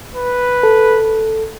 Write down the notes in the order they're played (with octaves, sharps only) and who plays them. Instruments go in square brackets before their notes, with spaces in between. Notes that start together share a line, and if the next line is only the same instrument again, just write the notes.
[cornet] B4
[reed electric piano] A4